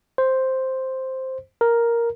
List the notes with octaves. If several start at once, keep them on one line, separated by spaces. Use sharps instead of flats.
C5
A#4